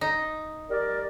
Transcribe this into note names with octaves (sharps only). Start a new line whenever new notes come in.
D#4
G3 A#4 D5